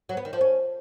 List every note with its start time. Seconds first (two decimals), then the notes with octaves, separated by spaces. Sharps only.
0.09 F#3
0.17 B3
0.25 D#3
0.33 F3
0.41 C#4